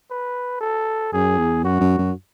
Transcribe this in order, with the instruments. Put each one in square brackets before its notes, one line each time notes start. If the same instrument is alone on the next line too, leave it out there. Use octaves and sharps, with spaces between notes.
[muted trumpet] B4
A4
[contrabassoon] F#2 [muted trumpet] G#4
[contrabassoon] E2
[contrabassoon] F#2 [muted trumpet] F#4
[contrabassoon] F#2
F#2